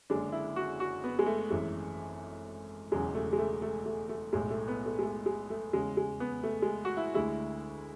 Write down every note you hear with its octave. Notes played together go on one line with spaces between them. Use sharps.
F#1 F#2 D3 G#3 D4
E4
F#4
F#4
B3
G#3
A3
G#1 F#2 E3 G#3
E1 E2 C#3 F#3 G#3
A3
G#3
A3
A3
A3
A3
B1 A2 G#3
A3
B3
A3
G#3
A3
G#3
A3
E2 C#3 G#3
G#3
B3
A3
G#3
F#4
E4
D2 D3 G#3 E4